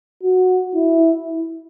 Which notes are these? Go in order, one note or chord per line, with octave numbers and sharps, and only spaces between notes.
F#4
E4